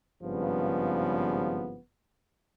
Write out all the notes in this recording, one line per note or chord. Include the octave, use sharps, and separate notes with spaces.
G#1 G2 C#3 F3 B3